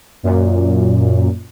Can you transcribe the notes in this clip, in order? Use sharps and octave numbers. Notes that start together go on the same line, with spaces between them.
F#2 A#2